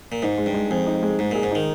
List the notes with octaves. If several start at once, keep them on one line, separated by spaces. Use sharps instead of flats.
A#2
G#2 D#4
G#3
G2
G#3
F2 G#4
D#4
G#3
G#2 G#3
A#2 G#4
G#2
D#3 D#4